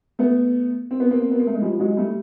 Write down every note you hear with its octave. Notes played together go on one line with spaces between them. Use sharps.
A3 B3
C4
B3
A#3 C4
B3
A#3
A3
G#3
F3 G3
F#3 G#3
G3 A3